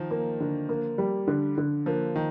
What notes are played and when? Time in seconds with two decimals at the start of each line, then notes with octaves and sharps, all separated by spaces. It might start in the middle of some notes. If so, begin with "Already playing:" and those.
Already playing: D#3 F3
0.11 A#3
0.40 D3
0.69 A#3
0.98 G3
1.28 D3
1.58 D3
1.86 F3 A#3
2.16 D#3